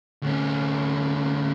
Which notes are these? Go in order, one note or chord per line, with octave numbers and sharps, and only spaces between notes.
D2 C#4